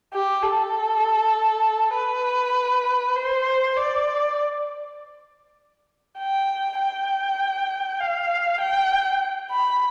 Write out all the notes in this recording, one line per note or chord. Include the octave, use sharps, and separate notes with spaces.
G4
A4
B4
C5
D5
G5
G5
F5
G5
B5